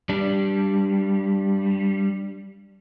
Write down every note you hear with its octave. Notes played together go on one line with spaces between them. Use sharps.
G3 D4